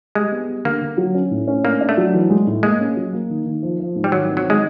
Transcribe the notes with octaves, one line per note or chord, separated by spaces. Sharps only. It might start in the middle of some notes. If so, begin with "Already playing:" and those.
G3 G#3
B3
G3
D3 A#3
D3
F#3
C#4
A2
C#4
A#3 D4
D4
A3
F#3
E3
G#3
A2
G#3 A#3
C#4
F#3
A#3
D#3
D#3
F3
F3
G#2
G3
D#3 F#3
C4
F#3
D#3
G#3